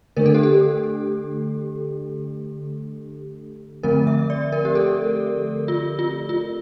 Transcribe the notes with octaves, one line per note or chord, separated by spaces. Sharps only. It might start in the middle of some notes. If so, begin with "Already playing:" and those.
D3 A3 D4 A#4
A4
G4
A4
D3 F3 A3 C4 A#4
E5
D5
A#4
G4
A4
F4
F4
F4